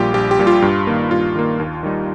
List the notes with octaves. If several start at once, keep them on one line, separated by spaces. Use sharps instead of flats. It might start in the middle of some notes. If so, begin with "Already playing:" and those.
Already playing: A#1 A#2 G3 F4 G4
A#1 G4
G4
A#2 G3
F4
G2
D#3 A#3
G2 F4
D#3 A#3
D#2
D#3 G3 D#4